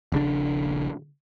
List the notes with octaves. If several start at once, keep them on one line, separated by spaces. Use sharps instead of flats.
D#1 A#1 C#3 D4